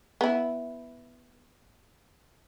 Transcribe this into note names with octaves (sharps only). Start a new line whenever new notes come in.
B3 E4